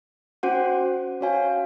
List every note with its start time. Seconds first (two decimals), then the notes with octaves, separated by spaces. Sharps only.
0.43 C#4 F#4 C5 F#5
1.21 C#4 F#4 C#5 F5 G#5